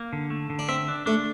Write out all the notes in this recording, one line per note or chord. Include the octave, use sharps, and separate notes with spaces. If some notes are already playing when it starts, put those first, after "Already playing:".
Already playing: A#3
D3
A3
D3
D4
C4 E5
D4
A3 D4